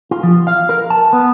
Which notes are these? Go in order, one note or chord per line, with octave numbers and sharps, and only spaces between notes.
F4
F3
F5
A#4
A5
B3